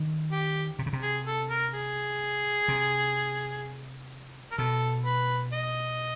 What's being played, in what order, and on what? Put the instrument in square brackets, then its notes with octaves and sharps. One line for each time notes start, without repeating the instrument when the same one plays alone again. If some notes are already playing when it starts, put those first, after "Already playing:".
Already playing: [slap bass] D#3
[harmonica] G4
[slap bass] C3
C#3
C3
[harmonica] G#4
A4
A#4
G#4
[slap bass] C3
[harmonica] A#4
[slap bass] B2 [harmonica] A4
[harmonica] B4
D#5